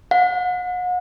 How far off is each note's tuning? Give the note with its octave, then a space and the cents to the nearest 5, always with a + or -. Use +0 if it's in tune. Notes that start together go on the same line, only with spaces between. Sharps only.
F#5 -40